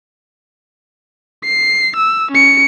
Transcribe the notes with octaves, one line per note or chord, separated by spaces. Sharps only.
C7
E6
C#4 C#7